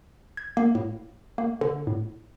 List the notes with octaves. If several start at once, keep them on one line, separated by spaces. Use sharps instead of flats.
G#6
A#3
A2
A#3
D3
A2